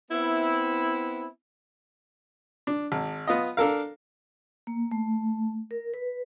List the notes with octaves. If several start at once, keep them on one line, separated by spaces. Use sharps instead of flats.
B3 C4 E4
D4
G#1
B3 F4 D#5
D4 A4 A#4 F5
A#3
A3
A#4
B4